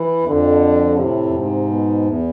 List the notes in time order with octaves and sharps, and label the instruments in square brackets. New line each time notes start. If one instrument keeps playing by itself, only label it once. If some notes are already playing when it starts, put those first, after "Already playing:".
Already playing: [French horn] E3
[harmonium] E2
[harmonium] F2 [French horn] D3
[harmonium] A2 [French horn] C3
[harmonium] F2
G#2
[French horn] B2
[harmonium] E2